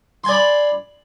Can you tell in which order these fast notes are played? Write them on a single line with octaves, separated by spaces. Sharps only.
C6 G#5 D5 B5